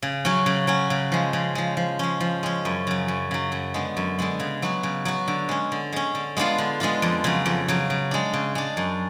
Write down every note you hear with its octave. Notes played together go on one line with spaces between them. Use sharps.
C#3
F#3 C#4 F#4
C#3
F#3 C#4 F#4
C#3
F3 G#3
C#3
F3 G#3
F3
G#3 C#4
F3
G#3 C#4
F#2
C#3 F#3
F#2
C#3 F#3
F#2
D3 G#3 B3
F#2
D3 G#3 B3
C#3
F#3 B3 F#4
C#3
F#3 B3 F#4
D3
G#3 C#4
D3
G#3 C#4
D3
G#3 B3 D4 F4
D3
G#3 B3 D4 F4
F2
C#3 F#3
F2
C#3 F#3
C#3
G#3 D4
C#3
G#3 D4
F#2